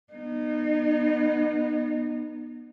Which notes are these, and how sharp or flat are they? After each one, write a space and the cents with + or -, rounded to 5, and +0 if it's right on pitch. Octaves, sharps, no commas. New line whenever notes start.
B3 -20 D#4 -30